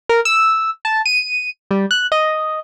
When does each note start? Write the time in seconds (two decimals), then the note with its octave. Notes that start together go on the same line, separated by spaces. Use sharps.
0.09 A#4
0.25 E6
0.85 A5
1.06 D#7
1.71 G3
1.91 F#6
2.12 D#5